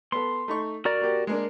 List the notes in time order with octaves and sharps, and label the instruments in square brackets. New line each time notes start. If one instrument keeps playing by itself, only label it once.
[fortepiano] B3 A4 [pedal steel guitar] C6
[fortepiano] A3 D#4 C#6
[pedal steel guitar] F#4 A#4 D5 [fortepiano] A#5
[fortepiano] A#3 G4
G#3 A#3 D4